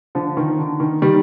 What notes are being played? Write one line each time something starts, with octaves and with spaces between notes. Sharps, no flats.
D3 F3
D#3
D3
D#3
D#3 G3